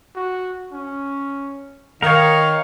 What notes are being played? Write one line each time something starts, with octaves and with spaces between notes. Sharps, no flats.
F#4
C#4
D#3 A#4 C#5 F5